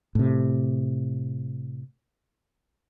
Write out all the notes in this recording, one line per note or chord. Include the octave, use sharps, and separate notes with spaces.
A2 C3